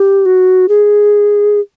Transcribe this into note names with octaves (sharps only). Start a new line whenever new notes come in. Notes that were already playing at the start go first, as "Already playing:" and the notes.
Already playing: G4
F#4
G#4